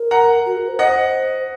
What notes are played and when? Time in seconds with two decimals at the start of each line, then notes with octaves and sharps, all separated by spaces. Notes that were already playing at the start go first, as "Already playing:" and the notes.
Already playing: A#4
0.11 F#5 A#5
0.46 F#4
0.57 A#4
0.68 C5
0.79 C5 D#5 F#5